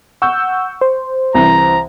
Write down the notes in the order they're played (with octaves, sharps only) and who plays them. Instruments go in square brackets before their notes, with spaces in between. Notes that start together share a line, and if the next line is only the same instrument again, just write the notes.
[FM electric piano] F#5 E6 G6 [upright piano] C#6
[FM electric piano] C5
[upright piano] C2 E3 [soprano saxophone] A#5